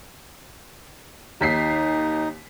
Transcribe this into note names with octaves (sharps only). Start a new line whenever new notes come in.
D#2 D#4 B6 C7